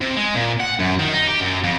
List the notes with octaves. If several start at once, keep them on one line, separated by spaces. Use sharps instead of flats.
C3
G#3
A#2
F#5
F#2
D#3
D#4
G4
F#2
F2